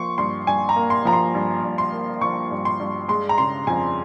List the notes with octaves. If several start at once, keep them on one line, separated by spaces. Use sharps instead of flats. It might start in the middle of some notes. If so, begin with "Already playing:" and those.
Already playing: F3 A#3 C6 C#6
G2 C6
G2 G#5
A#5
A#3
C6
F3 A#5
C6
G2
G2
C6
A#3
F3 C#6
G2
C6
G2
G#3 C6
A#5
C#3 C6
F2 G#5